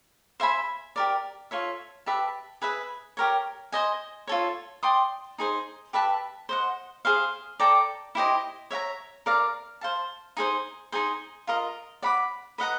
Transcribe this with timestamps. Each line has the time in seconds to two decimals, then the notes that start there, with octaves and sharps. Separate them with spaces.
0.40 C5 E5 G#5 B5
0.96 G4 A#4 D5
1.51 F4 A4 C#5 E5
2.06 G4 B4 E5 A5
2.62 G#4 B4 E5
3.17 G4 A#4 C#5
3.72 C5 D#5 G#5
4.27 F4 A4 C#5
4.83 D5 G5 C6 D#6
5.38 D#4 G#4 C5
5.93 G4 B4 E5 A5
6.49 C5 D#5 F#5
7.05 G#4 C5 F5
7.60 A4 D5 G5 A#5
8.15 E4 G4 C5 D#5
8.71 C#5 E5 G5 A#5
9.26 A#4 D5 F5 A#5
9.81 C5 F5 A5
10.37 D#4 G#4 C5
10.92 D#4 G#4 C5
11.47 F4 A#4 D#5
12.02 D5 F#5 B5 D6
12.58 B4 D#5 F#5 A#5